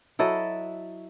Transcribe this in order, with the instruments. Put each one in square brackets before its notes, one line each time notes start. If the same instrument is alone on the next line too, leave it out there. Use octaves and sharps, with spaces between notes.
[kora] F#3 E4 A4 D#5